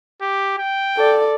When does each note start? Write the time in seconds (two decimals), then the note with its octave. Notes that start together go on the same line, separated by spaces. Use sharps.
0.21 G4
0.58 G5
0.97 A4 D5